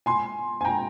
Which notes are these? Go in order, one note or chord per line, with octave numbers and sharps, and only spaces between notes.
G#5 C6
G#5
G5 A#5